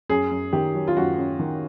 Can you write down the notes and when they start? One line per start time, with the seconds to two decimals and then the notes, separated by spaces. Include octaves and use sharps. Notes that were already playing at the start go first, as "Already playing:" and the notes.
0.09 F#2 G#4
0.31 F#2
0.53 D#3 G4
0.75 F#3
0.87 F4
0.96 F#2 F#4
1.18 F#2
1.39 D#3